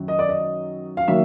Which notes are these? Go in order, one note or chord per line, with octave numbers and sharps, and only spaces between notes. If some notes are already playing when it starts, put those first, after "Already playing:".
Already playing: F#2 D#3 F#3
D#5
D5
D#5
F5
D#3 F#3 A#3 E5